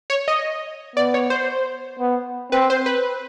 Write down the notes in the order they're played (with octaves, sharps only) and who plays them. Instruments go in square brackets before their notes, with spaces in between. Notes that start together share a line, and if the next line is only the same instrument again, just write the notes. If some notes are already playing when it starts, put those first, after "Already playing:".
[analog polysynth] C#5
D#5
[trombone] B3 [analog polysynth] D5
[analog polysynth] C#5
C5
[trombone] B3
[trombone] C4 [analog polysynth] B4
[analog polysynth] C5
B4